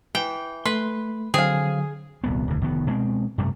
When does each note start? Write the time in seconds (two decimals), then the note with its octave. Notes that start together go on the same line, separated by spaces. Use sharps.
0.15 E3 G5
0.65 A3 B4 C6
1.34 D3 F#3 C4 G#4 F5
2.24 D#1 C2 B3
2.48 E1 D2
2.62 F1 D#3 B3
2.87 B2 G#3 C4
3.38 F#2 C3 G3 A3